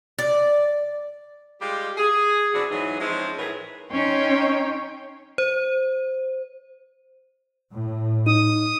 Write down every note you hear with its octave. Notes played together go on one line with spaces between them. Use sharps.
D5
G3 G#3 F4 G4
G#4
B2 E3 C4 D4 E4 F#4
G#2 E3 F#3 B3 D#4 G#4
F3 G#3 C4 C#4 D#4 E4
A2 E3 F#3 G#4 A#4 B4
C#4 D#4 C#5 G5 C6
C5
A2
D#4 D#6